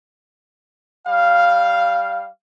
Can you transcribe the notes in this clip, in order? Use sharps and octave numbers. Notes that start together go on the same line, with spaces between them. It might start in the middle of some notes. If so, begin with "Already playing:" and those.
G3 F5